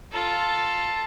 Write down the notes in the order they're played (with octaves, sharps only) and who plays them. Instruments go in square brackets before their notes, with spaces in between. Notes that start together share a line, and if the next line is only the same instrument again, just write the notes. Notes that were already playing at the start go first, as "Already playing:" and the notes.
[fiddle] F4 A4